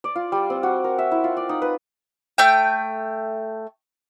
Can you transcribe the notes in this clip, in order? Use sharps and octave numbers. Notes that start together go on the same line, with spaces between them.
D5
F4
G3
C4
F#4
A#4
E5
E4
F4
D5
D#4
B4
A3 G5